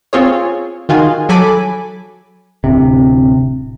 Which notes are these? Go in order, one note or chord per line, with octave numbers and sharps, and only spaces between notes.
C4 F4 G#4 C#5
D#3 F4 F#4 G#4
F#3 A4 G#5 B5 D6
D1 C3